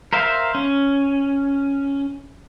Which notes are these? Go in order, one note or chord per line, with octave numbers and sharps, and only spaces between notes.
A#4 C5 E5 F5
C#4